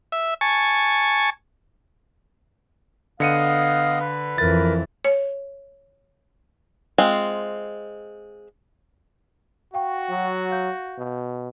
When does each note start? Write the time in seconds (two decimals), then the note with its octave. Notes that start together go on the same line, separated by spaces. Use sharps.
0.12 E5
0.41 G#5 A5 C#6
3.20 D3 B3 D#5 F5 C#7 D#7
4.00 B4
4.38 F2 E3 A#4 A6
5.05 C#5
6.98 G#3 C4 F4
9.74 F#4 F5 G5 C#6
10.10 F#3
10.51 F5 G6
10.98 B2